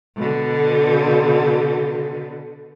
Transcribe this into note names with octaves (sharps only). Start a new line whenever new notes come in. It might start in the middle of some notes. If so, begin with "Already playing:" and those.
B2 D3